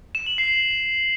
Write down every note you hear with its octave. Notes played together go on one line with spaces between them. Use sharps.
E7
F#7
C7